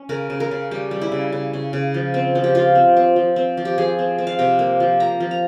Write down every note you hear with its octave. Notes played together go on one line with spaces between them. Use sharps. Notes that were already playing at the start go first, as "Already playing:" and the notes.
Already playing: C#4
C#3 A#4
C#3
A#4
C#3
G3 G4
G3
E4
C#3
C#3
C#3
C#3
F3
C4
F3
G4
F3 F4
C4
C4
F3
C4
F3
G4
F3 G#4
C4
C4
F5
C3 G5
A#3
F3
A#3 A#5
F3
A#5